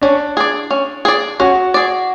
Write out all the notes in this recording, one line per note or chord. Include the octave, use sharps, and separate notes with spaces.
C#4 D4
G#4 D5
C#4
G#4 D5
C#4 F#4
G#4 D5